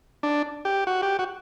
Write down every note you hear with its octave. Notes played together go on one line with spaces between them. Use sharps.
D4
G4
F#4
G4
F#4